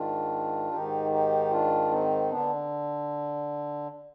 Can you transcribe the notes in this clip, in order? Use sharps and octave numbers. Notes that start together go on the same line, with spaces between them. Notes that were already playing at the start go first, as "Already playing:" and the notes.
Already playing: G#2 D#3 D4 F4
G#2 D#3 D#4 G4
D#4 G4
D4 F4
C4 D#4
D3 B3 D4